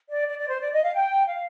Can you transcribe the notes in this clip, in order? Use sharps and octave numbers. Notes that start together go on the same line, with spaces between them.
D5
D5
D5
C5
D5
D#5
F5
G5
F5